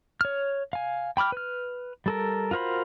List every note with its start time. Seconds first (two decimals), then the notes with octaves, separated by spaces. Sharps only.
0.21 C#5 F6
0.73 F5 G#5
1.17 G5 B5 D6 F6
1.32 B4 F6
2.06 G3 A4 A#4
2.51 F4 F#4 A#4 C5 B5